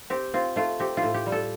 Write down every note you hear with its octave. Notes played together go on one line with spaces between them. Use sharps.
C4 G4
C4 F4
A3 F4
C4 G4
F4
A2
G4
G3
A4